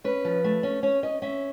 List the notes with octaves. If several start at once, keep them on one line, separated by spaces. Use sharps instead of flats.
C#4 B4
F3
A3
C#4
C#4 C#5
C#4 D#5
C#4 E5